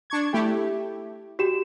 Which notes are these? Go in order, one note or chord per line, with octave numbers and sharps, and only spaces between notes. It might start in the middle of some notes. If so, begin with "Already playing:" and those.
D4 C#6 G#6
A3 E4 G4
F#4 G4 E7